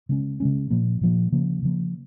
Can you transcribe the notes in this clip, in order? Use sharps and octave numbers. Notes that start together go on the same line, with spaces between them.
C#3 G#3 C#4
C#3 G#3 C#4
A#2 F3 A#3
A#2 F3 A#3
C#3 F3 A#3
C#3 F3 A#3